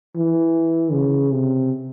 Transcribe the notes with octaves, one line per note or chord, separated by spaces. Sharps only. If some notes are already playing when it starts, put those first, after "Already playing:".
E3
C#3
C3